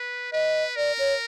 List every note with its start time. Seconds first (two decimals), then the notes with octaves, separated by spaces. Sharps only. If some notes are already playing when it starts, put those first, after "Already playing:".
Already playing: B4
0.33 B4 D#5
0.76 A#4 D5
0.99 C#5